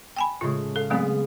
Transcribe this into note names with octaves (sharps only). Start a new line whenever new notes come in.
G5 G#5 B5
A2 C#3 G#3 F4
A4 F5
F#3 G#3 A3 B3 C4